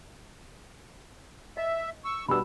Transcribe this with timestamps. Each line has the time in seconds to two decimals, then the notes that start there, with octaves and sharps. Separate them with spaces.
1.57 D#5 E5
2.04 C#6 E6
2.29 B2 G3 B3 D4 B5 E6